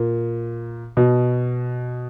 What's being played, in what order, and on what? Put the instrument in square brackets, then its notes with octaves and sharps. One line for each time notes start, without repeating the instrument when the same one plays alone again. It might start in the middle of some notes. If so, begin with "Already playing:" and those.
Already playing: [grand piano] A#2
B2